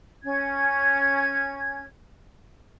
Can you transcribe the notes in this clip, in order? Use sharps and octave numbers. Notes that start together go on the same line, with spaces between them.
C#4 G#6